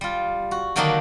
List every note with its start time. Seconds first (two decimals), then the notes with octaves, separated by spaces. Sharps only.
0.01 G3 F4
0.51 F#4
0.76 D3 D#3 F#3 A#3 D4 D#4